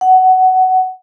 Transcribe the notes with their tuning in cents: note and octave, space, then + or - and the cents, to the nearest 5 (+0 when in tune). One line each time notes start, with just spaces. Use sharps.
F#5 +15